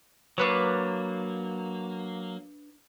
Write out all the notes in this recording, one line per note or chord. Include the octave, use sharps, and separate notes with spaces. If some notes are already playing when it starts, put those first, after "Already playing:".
F#3 A#3 D4 B4 C#5